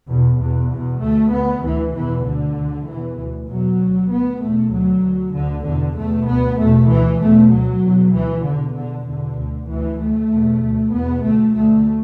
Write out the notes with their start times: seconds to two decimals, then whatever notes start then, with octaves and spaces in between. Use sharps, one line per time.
0.08 E2 B2
0.39 E2 B2
0.70 E2 B2
1.01 D2 A3
1.32 D2 B3
1.63 D2 E3
1.94 E2 B2 E3
2.25 D2 D3
2.57 D2
2.87 E2 B2 E3
3.18 D2
3.49 E2 B2 F#3
3.80 D2
4.11 D2 B3
4.42 E2 B2 A3
4.73 D2 F#3
5.04 D2
5.35 D2 D3
5.66 E2 B2 D3
5.97 E2 B2 A3
6.28 D2 B3
6.60 E2 B2 A3
6.90 D2 E3
7.21 E2 B2 A3
7.52 D2 F#3
7.82 E2 B2
8.14 D2 E3
8.44 E2 B2 D3
8.75 E2 B2 D3
9.06 E2 B2 D3
9.37 D2
9.68 D2 E3
9.99 D2 A3
10.30 E2 B2
10.62 D2
10.93 E2 B2 B3
11.24 D2 A3
11.54 D2 A3